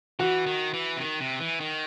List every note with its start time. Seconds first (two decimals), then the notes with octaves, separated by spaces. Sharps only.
0.19 E3 F#4
0.46 D#3
0.73 E3
0.97 C3
1.00 D#3
1.20 C3
1.40 E3
1.60 D#3